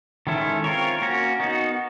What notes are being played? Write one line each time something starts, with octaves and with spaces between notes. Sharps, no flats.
D#3 G#3 C#4 E4 A4
C4 F4 A#4 C#5
A#3 C#4 F#4 A#4
B3 D#4 F#4